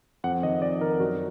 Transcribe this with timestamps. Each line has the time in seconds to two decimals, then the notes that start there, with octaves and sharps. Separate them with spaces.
0.24 F2 F#5
0.43 D#3 D#5
0.62 F2 D5
0.81 D#3 A#4
1.00 F#2 F#4